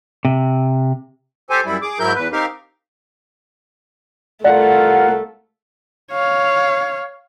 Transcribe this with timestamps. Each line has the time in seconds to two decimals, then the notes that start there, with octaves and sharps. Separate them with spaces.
0.25 C3
1.50 G4 A4 C5 G#5
1.65 F#2 G3 E4
1.82 G#4 D6
1.99 G#2 F#3 E4 A#4 G6
2.15 E2 B4
2.32 C4 D#4 G4 A#4 F5
4.44 C2 A3 F4 A#4 D5 F#5
6.12 C#5 F5